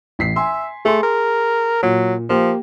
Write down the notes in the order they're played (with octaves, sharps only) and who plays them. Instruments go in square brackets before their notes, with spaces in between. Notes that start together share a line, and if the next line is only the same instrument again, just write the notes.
[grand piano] A1 B6 C7
[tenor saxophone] E5 [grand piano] G#5 C6
[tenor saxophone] A3 [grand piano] G#4 C6
[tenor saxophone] A#4
[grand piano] A#2 [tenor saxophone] F#3
[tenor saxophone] F3 [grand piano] A#3 G4